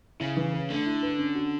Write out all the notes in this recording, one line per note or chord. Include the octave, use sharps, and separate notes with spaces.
C#3 E4
E3
B4
D3 A3
E4
B4
C#4
F#4